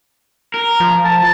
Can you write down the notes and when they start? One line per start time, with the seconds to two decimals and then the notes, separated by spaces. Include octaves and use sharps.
0.54 A#4
0.80 F3
1.05 A5